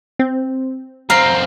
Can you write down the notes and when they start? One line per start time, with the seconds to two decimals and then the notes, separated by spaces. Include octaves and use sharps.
0.19 C4
1.10 F#2 C4 F5 A#5